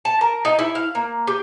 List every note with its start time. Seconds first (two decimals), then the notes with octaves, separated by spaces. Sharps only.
0.05 A5
0.21 A#4
0.45 D#4
0.59 E4
0.75 F5
0.95 A#3
1.27 G4